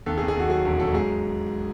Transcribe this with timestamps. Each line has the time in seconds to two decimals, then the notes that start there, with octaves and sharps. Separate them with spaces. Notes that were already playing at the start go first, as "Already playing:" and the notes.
0.06 D#2 A4
0.18 G#4
0.21 D#2
0.28 G#4
0.36 D#2 F#4
0.50 F#3 G#4
0.65 E1
0.79 F#3 A4
0.94 G#2 G#4